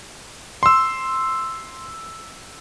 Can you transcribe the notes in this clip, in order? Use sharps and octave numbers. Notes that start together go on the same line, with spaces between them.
C6 E6